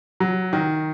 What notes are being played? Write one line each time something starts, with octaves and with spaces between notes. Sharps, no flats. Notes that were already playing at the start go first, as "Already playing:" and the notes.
F#3
D#3